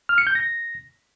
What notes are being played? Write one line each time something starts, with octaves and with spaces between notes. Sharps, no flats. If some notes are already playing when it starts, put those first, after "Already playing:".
F6
C#7
G6
A#6